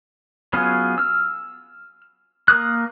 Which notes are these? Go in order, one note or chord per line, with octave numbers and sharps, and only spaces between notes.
F#3 B3 C#4 F4 G#4
E6 F6
A#3 A#4 D#6 F#6